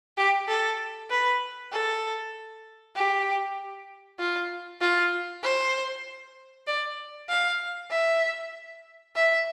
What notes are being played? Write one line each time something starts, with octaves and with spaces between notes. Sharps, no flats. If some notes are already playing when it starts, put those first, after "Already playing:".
G4
A4
B4
A4
G4
F4
F4
C5
D5
F5
E5
E5